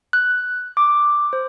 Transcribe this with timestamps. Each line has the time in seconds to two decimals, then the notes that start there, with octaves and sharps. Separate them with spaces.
0.13 F#6
0.77 D6
1.33 C5